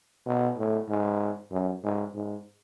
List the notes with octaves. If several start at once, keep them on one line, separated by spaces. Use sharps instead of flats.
B2
A2
G#2
F#2
G#2
G#2